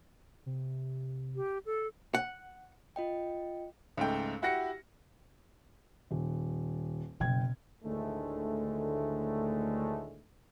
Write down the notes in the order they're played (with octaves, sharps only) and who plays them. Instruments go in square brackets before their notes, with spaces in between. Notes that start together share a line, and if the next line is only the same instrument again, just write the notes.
[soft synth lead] C3
[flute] G4
A4
[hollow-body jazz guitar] F#5
[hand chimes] F4 D#5 G5
[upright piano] C#2 G#2 A3 G5
E4 F#4 G4 F#5 A#6 C#7
[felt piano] D#1
[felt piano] F#1 G5 G#6 [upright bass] B2
[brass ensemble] D2 A2 D3 D#3 G#3 A3